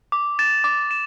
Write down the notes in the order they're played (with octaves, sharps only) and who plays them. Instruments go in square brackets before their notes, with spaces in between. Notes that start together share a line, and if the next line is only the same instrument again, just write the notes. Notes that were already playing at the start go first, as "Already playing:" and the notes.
[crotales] D6
A6 E7
D6
E7